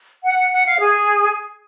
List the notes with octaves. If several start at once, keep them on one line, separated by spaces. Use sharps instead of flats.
F#5
F#5
F5
G#4